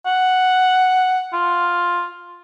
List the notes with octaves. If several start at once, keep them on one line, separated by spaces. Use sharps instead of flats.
F#5
F4